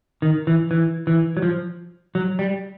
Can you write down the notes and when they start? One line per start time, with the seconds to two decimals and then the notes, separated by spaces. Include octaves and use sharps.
0.22 D#3
0.47 E3
0.71 E3
1.07 E3
1.37 F#3
1.42 F3
2.15 F#3
2.39 G3